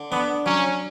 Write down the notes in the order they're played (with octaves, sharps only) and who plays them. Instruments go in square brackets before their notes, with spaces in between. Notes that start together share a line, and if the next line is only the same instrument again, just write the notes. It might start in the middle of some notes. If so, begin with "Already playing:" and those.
Already playing: [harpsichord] D3
[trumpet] B3 [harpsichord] D4
[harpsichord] F#3 [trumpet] C#4